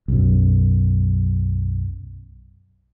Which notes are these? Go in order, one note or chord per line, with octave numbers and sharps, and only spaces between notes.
B1 F#2